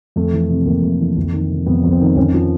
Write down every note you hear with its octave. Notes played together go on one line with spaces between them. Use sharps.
F2 A3
E3
C3
F2 A#3
F2
E3
F2
D#3
C3
F2 B3
F2
C4
D#3
F2 C#4
F3